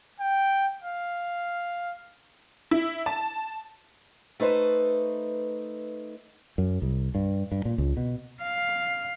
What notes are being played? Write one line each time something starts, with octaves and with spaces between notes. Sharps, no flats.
G5
F5
E4
A5
A3 D#4 B4 C5
F#2
C2
G2
G2
A#2
C#2
B2
F5